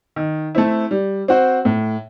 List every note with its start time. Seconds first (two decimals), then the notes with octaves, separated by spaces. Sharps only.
0.16 D#3
0.55 A3 C4 E4
0.91 G3
1.28 C4 F#4 C5
1.65 A2